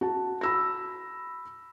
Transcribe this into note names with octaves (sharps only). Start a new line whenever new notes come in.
F#4 A5
B5 E6 A#6